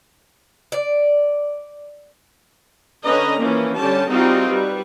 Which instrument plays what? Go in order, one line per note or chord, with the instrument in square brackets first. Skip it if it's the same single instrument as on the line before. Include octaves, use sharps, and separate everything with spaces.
[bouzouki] D5
[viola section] D3 C#4 B4 D#5 A#5
E3 F3 A#3 C#4
D3 G3 C#4 G4 A5
G3 C4 D#4 F4 F#4 G#4
G3 B4